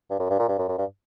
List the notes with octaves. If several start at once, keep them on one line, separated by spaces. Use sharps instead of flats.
G2
F#2
G2
A#2
G2
F#2
F#2
G2